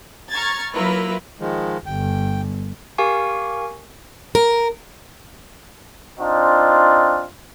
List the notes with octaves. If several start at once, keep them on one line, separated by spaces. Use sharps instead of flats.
A#5 C#6 F6 G#6 A6
F#3 A#3 E4 F4 A#4 B4
D#3 F3 G#3
G1 G5
G4 A#4 F5 G#5 C#6
A#4
C4 D4 D#4 F4